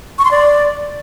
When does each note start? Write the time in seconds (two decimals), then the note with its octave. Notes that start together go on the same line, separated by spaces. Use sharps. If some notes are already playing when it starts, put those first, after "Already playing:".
0.19 C#6
0.25 C6
0.31 D5